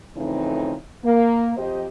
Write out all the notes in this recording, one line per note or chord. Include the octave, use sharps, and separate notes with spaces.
F2 A2 C#3 E3 C4 D#4
A#3
F2 G4 C5 D#5